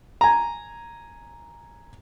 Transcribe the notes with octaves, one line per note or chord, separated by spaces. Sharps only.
G#5 A#5